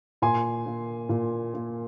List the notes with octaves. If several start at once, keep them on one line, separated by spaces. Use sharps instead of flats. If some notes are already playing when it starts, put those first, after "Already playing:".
A#2 G#5 C6
A#3
A#2
A#3